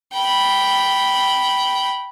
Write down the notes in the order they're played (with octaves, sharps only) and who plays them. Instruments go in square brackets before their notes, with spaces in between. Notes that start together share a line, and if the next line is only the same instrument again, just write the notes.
[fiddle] G5 B5